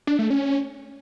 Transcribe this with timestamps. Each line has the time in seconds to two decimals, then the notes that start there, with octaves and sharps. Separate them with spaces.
0.07 D4
0.19 A3
0.30 C#4